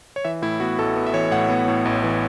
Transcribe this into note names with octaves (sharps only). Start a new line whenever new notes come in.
C#5
E3 E5
A2 E4
B3 F#4
A1 A4
B3
E5
E3 C#5
A2 F#5
B3
A2
A1
E3